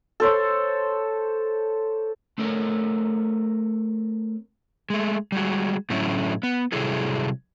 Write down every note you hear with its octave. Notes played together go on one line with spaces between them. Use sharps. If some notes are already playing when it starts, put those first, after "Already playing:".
A4 C5 C#5
A3 C4 A4 A#4 C#5
G#3 A3
G3 G#3 F#4
A2 D3 F#3 A3 C#4 E4
B3
C3 F#3 G3 E4 G#4 A4